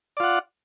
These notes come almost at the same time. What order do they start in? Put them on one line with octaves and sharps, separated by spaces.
D5 F4 F#5